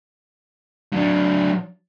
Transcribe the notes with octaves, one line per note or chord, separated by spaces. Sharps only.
F#3 D4